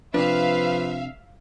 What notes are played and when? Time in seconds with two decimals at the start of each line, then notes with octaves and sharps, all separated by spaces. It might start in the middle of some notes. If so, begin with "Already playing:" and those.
0.14 C3 F3 D4 B4 E5 F5